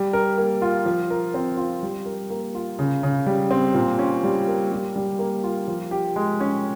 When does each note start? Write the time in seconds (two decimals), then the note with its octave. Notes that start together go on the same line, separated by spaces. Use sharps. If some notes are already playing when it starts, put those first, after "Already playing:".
Already playing: G3
0.13 A#4
0.38 A#3
0.62 F4
0.86 F3
1.10 A#4
1.34 C4
1.57 F4
1.83 G3
2.06 A#4
2.30 A#3
2.55 F4
2.79 C#3
3.03 C#3
3.26 G3
3.51 C4
3.74 A#2
3.99 C#4
4.24 G3
4.48 A#3
4.72 G3
4.96 G3
5.19 A#3
5.44 F4
5.68 F3
5.91 G4
6.16 G#3
6.40 C#4